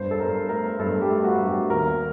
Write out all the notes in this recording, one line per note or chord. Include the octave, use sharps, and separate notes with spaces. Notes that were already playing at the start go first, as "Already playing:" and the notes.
Already playing: G2 C5
A4
G2 A#4
A3 A#4
G2 A4
G4
A3
F#4
G2
G4
D#2 A#4